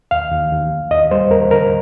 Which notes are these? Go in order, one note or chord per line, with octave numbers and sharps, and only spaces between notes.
D#2 F5
D#2
D#2
D#2
D#2 D#5
G3 C5
D#2 A#4
D3 A#4